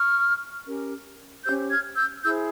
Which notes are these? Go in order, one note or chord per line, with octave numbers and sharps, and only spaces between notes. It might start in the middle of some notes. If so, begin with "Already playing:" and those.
Already playing: C#6 F6
C#4 G4 A#4
C#4 G4 C5 E6 G6
F6 G#6
E6 G6
E4 G#4 C5 E6 G6